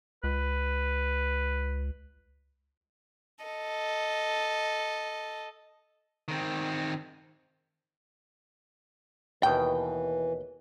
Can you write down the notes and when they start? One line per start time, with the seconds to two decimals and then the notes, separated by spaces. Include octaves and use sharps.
0.24 C#2 B4
3.45 A4 D#5
6.28 D#3 C4
9.43 D#2 B2 E3 G5